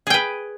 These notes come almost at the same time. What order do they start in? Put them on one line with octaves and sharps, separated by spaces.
G#4 G5 B4